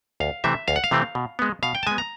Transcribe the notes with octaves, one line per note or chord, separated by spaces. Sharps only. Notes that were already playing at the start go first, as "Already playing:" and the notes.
D2 F5
C3 E3 A3 C4 E5
D2 F5
F#5
F5
C3 E3 A3 C4
B2
G#3 B3
B2 F5
G5
A5
G#3 B3 G#5
A#5